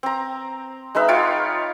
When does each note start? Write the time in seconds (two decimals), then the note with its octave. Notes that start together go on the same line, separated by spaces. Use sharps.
0.03 C4 A#5
0.95 G#3 D#4 B4 E5
1.08 F4 C#5 F5 G5